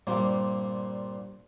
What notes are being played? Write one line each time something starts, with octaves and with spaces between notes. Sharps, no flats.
G2 A#2 A#3 C4